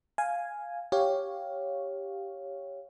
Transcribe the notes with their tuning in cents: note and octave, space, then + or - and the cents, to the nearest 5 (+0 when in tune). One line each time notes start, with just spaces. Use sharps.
F5 +0 G#5 +0
G4 +0 C#5 +0 F5 +5